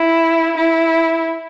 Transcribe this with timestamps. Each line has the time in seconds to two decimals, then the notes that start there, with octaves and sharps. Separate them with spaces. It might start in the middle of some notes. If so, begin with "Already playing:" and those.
Already playing: E4
0.57 E4